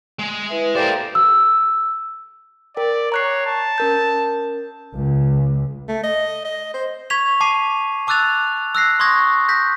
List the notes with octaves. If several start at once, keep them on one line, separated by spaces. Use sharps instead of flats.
G#3
E4 B4 E5
G4 A4 A#4 C5 D5 F5
E6
A#4 D5 G5
C#5 A#5 F#6 C7
A5
C#4 A#4 G6
C#2
A3
D#5
D#5
C5
C#6 G#6 B6 F7
A5 D6 B6 C7 D#7
A5 D6 E6 F#6 A6 F7
E6 F#6 A#6 C7
C6 C#6 D#6 G#6 A#6
G6 A#6 B6